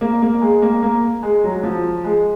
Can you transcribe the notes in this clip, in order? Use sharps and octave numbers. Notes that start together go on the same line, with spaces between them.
A#3
A#3
G#3
A#3
A#3
G#3
F#3
F3
G#3